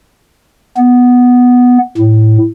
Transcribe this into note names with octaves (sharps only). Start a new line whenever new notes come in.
B3
A2